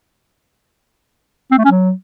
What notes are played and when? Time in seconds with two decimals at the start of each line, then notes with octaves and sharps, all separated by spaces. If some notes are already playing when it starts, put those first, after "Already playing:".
1.51 C4
1.58 A3
1.65 C#4
1.71 F#3